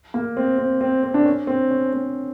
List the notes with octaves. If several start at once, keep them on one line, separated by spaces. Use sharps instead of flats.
A#3
C4
C4
C4
C4
D4
C#4
C4
C#4
C4